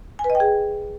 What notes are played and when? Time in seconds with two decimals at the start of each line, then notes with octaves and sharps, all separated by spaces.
0.19 G#5
0.24 B4
0.30 D#5
0.35 G5
0.40 G#4